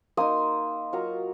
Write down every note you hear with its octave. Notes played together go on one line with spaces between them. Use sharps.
A#3 D#4 C6 D#6
F#3 A#3 F4 A#5 C#6